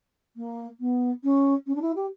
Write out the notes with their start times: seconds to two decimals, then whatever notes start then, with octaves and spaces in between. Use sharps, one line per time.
0.36 A#3
0.80 B3
1.23 C#4
1.67 C#4
1.75 D4
1.81 E4
1.96 G4